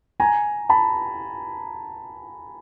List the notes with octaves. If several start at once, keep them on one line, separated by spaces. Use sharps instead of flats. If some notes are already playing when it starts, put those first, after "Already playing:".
G#5 A#5
A5 B5